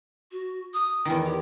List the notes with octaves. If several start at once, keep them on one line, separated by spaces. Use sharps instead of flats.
F#4
D#6
E2 D#3 E4
G4